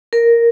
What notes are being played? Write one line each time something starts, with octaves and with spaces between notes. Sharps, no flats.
A#4